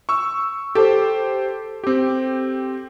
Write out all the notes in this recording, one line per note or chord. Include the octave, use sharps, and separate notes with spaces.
C#6 E6
G4 A4 C5
C4 G4